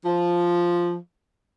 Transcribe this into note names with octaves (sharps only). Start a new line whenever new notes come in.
F3